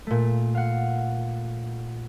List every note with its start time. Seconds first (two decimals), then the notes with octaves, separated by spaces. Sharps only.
0.07 A#2 A3
0.55 F5 F#5